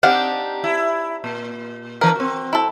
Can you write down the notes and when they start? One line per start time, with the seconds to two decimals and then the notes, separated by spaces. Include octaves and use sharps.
0.03 C4 D4 D#4 G4 F5 F#5
0.64 E4
1.24 A#2
2.01 E3 D4 A#4 B4
2.15 C4 F#4
2.53 E4 A4